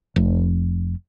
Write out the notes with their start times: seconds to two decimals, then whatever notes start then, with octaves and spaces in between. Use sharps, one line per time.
0.16 F1